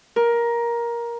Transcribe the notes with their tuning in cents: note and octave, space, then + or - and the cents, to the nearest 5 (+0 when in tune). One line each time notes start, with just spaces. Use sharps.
A#4 +15